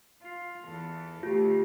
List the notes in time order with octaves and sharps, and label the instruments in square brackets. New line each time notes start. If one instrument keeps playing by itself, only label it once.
[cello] F4
E2 A4
[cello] D2 [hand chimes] F4 G4